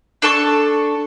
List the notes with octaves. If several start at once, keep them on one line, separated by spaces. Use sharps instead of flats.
D4 A4 A5 C#6